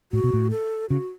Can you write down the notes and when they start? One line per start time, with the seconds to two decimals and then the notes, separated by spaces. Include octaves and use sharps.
0.12 A2 F#4
0.24 B2
0.33 A2
0.51 A4
0.90 C#3 F#4